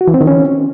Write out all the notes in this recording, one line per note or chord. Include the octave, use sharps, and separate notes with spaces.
F#4
E3
C4
D#3
C#4